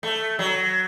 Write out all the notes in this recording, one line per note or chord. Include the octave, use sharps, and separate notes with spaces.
A3
F#3